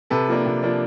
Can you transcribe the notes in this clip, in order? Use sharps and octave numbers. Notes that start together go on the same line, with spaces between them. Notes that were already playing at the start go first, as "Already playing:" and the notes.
C3 A4 B4
F3 A#3 D4
C3
F3 A#3 D4